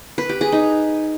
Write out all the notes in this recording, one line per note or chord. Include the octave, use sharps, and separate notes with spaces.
B4
G4
G#4
D#4